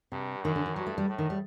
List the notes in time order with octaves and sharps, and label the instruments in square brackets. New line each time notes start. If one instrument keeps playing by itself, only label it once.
[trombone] G2 [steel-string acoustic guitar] C3
[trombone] F#2 [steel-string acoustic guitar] D#3
[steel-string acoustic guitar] D3
D#3
[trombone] G2 [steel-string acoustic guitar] F#3
[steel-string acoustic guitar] A3
G3
[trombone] A2
[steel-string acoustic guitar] D#3
G3